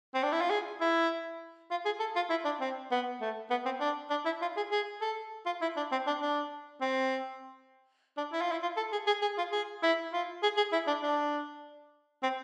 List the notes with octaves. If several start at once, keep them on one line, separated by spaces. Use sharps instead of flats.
C4
D4
E4
F4
G#4
E4
F4
G#4
A4
F4
E4
D4
C4
B3
A3
B3
C4
D4
D4
E4
F4
G#4
G#4
A4
F4
E4
D4
C4
D4
D4
C4
D4
E4
F4
E4
F4
A4
G#4
G#4
G#4
F4
G#4
E4
F4
G#4
G#4
E4
D4
D4
C4